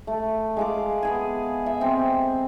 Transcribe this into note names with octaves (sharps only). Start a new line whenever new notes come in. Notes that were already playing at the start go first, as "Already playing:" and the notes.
A3
G#3 F5 D6
B3 G#4 G#5
E5
C4